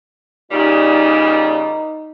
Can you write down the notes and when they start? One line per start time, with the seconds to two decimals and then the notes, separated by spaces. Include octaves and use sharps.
0.52 A#2 C#3 G3 D#4